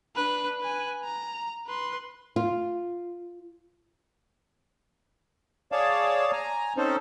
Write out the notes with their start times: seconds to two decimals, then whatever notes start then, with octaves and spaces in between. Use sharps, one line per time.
0.16 D4 B4
0.61 B4 G#5
1.04 A#5
1.67 B4 C6
2.36 F4
5.72 G#4 C#5 D5 F5 A5
6.32 G#5 A#5
6.77 C4 C#4 D#4 A4 C5